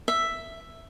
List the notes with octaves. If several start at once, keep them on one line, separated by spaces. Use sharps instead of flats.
E5